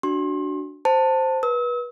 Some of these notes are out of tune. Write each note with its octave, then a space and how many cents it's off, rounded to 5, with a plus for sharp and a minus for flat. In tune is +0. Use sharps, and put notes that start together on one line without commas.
D4 +0 F#4 +10 C6 +35
C5 +0 A5 +15
B4 -30 E6 -40